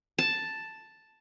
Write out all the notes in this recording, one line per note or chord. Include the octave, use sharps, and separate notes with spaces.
A5